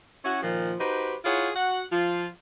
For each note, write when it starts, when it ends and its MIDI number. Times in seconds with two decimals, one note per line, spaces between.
0.25 0.40 61
0.25 0.40 64
0.25 0.40 66
0.42 0.74 46
0.42 0.74 51
0.42 0.74 53
0.79 1.15 63
0.79 1.15 66
0.79 1.15 67
0.79 1.15 71
0.79 1.15 72
1.25 1.49 64
1.25 1.49 65
1.25 1.49 68
1.25 1.49 73
1.25 1.49 78
1.56 1.84 66
1.56 1.84 78
1.92 2.27 53
1.92 2.27 65